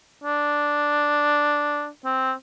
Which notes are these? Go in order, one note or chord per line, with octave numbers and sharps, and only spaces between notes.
D4
C4